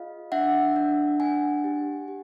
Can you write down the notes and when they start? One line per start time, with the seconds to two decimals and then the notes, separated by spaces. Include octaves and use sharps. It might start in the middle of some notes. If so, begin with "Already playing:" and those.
Already playing: F4 G#4 D#5 F5
0.32 D4 E5 F#5
0.76 D4
1.20 D4 F#5 G#5
1.64 G4
2.08 G4